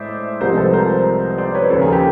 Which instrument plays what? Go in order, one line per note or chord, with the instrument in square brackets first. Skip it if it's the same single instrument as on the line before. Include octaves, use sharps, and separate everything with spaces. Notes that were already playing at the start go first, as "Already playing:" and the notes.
Already playing: [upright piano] A2 G#3 C5 D5 E5
C2 C3 F3 G#3 A#4 C5
A4 B4
A#4 C5
C5 D5
B4 C#5
D#2 C#3 F3 A4 B4
G#4 A#4
G4 A4